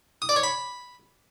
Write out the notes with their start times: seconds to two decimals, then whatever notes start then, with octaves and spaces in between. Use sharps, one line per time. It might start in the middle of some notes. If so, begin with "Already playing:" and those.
0.22 D#6
0.29 D5
0.36 C#5
0.43 B5